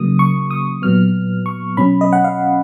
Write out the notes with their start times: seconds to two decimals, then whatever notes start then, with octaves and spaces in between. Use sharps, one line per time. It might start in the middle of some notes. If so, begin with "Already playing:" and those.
Already playing: C#3 F#3 A#3 D#6
0.19 C#6
0.51 D#6
0.82 A#2 F#3 B3 F6
1.46 C#6
1.77 B2 F#3 C#4 B5
2.01 D#5
2.13 F#5
2.24 F5